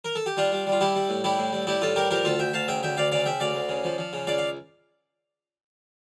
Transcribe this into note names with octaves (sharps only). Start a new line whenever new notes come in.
A#4
A4
G4
G3 D4 F4
G3
G3
F4
G3 E4 G4
G3
A2
G3 E4 G4
A2
G3
G3 E4 G4
A2 F4 A4
G3 G4 A#4
F3 G4 A#4
D2 F4 A4
D2 E5 G5
D2 F5 A5
C#3 E5 G5
D2 E5 G5
D2 D5 F5
C#3 D5 F5
C#3 E5 G5
D2 D5 F5
D2
C#3
F3
F3
C#3
C#2 D5 F5
F5